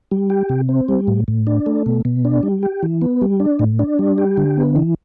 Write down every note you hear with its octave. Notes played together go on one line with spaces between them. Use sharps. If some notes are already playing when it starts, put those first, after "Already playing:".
G3
G4
C3
C4
G3
A2
A2
D4
A3
B2
B2
D4
G3
G4
E3
B3
G3
D4
A2
D4
G3
G4
D3
B3
E3